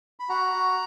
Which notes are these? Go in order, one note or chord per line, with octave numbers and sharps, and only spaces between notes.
B5
F#4 F#5 A#5
F#4